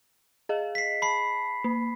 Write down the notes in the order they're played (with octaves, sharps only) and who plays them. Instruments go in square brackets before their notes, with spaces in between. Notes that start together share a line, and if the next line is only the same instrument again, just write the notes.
[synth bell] G#4 D#5 F5
[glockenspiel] B6 C7
[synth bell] A5 [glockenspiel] B5 C7
[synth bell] A#3